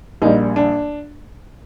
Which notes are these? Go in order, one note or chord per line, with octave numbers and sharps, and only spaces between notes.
A#1 A#2 G3 D#4
D4